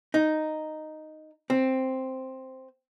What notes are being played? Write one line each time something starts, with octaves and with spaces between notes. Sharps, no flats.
D#4
C4